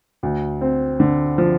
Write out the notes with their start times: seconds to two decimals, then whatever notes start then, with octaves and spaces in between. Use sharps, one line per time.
0.23 D2
0.61 C4
1.00 D3
1.38 F3